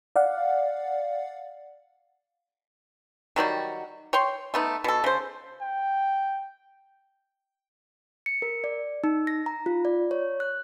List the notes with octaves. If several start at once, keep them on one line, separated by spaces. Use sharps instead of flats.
D5 F5 F#5
D#3 F#3 G3 F#4
C#5 G5 C6
A3 B3 D#4
B2 A4
C#3 C5
G5
C#7
A#4
D5
D#4
A#6
A#5
F4
D5
C#5
F#6